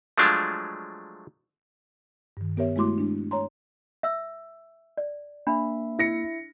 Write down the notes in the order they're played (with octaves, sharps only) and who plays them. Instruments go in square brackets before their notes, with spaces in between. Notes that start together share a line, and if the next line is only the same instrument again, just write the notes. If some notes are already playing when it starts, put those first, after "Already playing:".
[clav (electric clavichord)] F3 F#3 G#3 A3 D4 F4
[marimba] G2 D#3
B3 G4 A#4 C#5 E5
G#3 A3 E4 F#4 C6 D6
G#3 D4
C#5 A#5 C6
[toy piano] E5 E6
D5
[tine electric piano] A#3 E5 [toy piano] D4 B5
[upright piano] E4 A#6 C#7